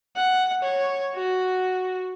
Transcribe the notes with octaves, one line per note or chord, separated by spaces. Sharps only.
F#5
C#5
F#4